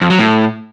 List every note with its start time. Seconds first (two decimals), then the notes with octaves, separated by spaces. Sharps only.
0.01 F2
0.10 F#3
0.19 A2